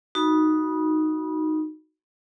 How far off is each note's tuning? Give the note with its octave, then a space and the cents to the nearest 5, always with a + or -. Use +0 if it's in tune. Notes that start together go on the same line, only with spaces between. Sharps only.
D#4 +0 F#4 +0 B5 -25